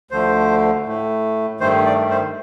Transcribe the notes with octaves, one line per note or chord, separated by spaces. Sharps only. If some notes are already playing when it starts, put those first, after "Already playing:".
D2 D3 F3 A3 C5
A2 A3
G2 D#3 A3 C5
D5
C5